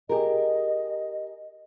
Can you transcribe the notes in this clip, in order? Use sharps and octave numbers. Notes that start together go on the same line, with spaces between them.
G4 G#4 A#4 D#5